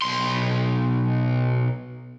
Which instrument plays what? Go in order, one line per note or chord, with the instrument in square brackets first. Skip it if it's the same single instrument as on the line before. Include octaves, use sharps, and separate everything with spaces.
[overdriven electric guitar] B1 C6